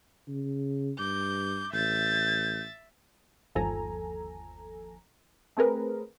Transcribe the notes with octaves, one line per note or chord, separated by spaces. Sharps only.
C#3
G2 D6 G6
A1 E5 G6 A6
G1 D#2 F3 A4 G#5 A#5
A3 C4 G#4 A#4 B4